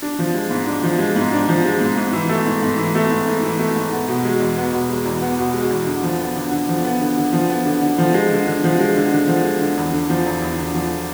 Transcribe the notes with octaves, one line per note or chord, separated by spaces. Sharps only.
D4
F3
G#3
G#2
D4
F3
G#3
G#2
D4
F3
G#3
G#2
G#2
E3
A3
G#2
G#2
E3
A3
G#2
G#2
E3
A3
G#2
B3
B2
G#3
E2
B3
B2
G#3
E2
B3
B2
G#3
E2
D3
F3
B3
D3
D3
F3
B3
D3
D3
F3
B3
D3
D3
F3
G#3
D3
D3
F3
G#3
D3
D3
F3
G#3
D3
E2
D3
F3
E2
E2
D3
F3